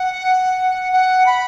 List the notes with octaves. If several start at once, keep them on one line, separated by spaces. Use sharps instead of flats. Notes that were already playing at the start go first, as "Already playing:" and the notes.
Already playing: F#5
F#5
B5